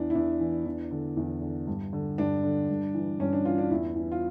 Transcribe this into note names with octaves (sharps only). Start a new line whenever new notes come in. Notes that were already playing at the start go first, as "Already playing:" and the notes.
Already playing: E2 E3 D4
E4
E2 D4
E3
E2
D3
E2
D3
G2
D3
G2 D4
D3
G2
E3
G2 C#4
D4
E3 F4
D4
E2 E4
E3
F4